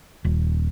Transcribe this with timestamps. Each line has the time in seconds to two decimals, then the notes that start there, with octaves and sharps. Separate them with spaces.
0.25 D#1